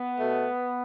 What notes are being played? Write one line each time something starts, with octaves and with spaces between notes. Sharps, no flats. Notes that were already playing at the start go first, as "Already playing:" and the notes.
Already playing: B3
B2 A3